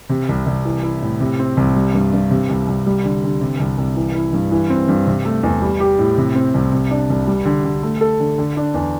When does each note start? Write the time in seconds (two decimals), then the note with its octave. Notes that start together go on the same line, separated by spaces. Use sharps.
0.09 C3
0.29 C2
0.46 C2
0.65 E3
0.83 E4
1.02 A2
1.20 C3
1.39 C4
1.57 C2
1.76 G3
1.94 G2
2.13 G2
2.31 C3
2.50 C2
2.67 C2
2.86 G3
3.04 D3
3.23 D3
3.41 C3
3.60 C2
3.78 C2
3.96 E3
4.15 E4
4.33 G2
4.51 E3
4.70 C4
4.88 G2
5.07 C3
5.25 A3
5.43 E2
5.62 G3
5.80 G4
5.99 A2
6.18 C3
6.35 C4
6.54 C2
6.72 C3
6.91 D4
7.10 C2
7.27 G3
7.45 D3
7.64 D3
7.83 A3
8.01 A4
8.20 D3
8.38 D3
8.57 D4
8.74 E2